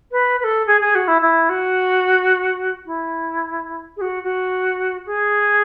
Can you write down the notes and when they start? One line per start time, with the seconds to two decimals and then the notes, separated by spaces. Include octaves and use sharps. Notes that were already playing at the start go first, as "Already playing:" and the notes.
0.12 B4
0.40 B4
0.44 A4
0.67 G#4
0.81 G#4
0.95 F#4
1.08 E4
1.21 E4
1.49 F#4
2.86 E4
3.97 G#4
4.01 F#4
4.23 F#4
5.06 G#4